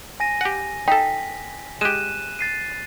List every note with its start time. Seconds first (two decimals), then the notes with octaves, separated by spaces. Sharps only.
0.20 G#5 A#6 D#7
0.41 G4 F#5
0.88 D#4 A4 G5 B6
1.81 G#3 G4 F#6 D#7 E7
2.39 A6 C7 D#7